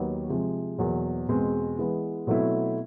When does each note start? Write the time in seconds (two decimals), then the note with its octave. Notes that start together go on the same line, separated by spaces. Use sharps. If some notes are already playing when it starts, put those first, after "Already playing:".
Already playing: D#2 D#3 F#3 B3 D#4
0.29 C3 F3 G#3
0.78 E2 B2 F#3 A#3
1.28 E2 B2 G#3 C4
1.78 E3 G#3 B3
2.27 B2 F#3 A3 C4 E4